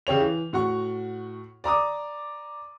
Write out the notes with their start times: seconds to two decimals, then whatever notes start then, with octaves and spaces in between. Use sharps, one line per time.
0.07 C#3 G4 C#5 F7
0.21 E3
0.53 A2 F#4 F#5 C#6
1.64 D5 A#5 D6 D#6